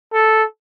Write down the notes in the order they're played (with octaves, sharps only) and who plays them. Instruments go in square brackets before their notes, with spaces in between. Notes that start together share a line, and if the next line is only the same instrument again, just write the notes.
[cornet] A4